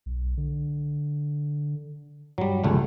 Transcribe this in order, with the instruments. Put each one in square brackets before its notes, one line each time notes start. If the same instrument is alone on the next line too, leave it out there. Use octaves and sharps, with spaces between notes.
[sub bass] B1
D3
[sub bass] G2 [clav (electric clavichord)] F#3 G3
[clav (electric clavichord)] G1 C#2 A3 [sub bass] F3